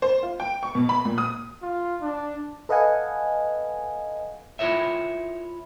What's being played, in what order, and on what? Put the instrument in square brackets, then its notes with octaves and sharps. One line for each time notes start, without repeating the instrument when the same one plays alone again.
[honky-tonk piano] C5
F4
G5
C#6
B2
B5
A#2
D#6
[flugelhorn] F4
D4
[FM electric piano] A4 B4 D#5 F5 F#5 G#5
[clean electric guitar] E4 F4 G4 A#4 C#5 E5